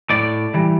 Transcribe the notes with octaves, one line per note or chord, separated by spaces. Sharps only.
A2 D5
E3 G3